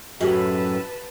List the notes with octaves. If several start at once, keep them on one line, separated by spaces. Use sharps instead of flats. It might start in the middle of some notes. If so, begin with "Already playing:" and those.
F#2 A2 F#4 G4 B4 A5